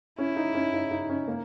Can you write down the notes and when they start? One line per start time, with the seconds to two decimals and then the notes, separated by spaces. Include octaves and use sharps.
0.18 C#4 E4
0.36 D#4
0.55 C#4
0.73 D#4
0.91 D#4
1.10 C#4
1.28 A#3